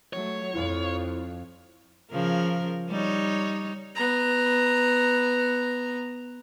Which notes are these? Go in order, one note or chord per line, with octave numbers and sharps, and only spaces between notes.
F#3 A3 C#5
F2 E4 F4
C#3 F3 A#4
G3 D#4 C#5
B3 A#5